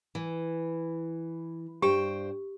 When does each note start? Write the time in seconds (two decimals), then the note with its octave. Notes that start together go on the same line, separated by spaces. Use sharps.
0.15 E3
1.82 G2 G4 C5 G5